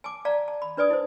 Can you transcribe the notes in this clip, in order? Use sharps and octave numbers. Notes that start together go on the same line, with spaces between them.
G#5 A5 D6
D5 F5 A5 A#5
A5
B5
D4 B4 D5 G#5 D#6
E4 C5